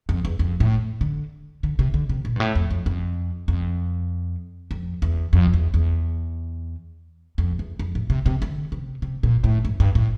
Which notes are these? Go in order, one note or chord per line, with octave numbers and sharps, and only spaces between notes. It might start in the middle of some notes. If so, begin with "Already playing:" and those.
F2
E2
F2
A2
D3
D3
C3
D3
C3
A#2
G2
A2
F2
F2
F2
F2
F2
E2
F2
E2
E2
F2
E2
F2
A2
C3
C3
D3
C3
C3
A#2
A2
G2
G2
A2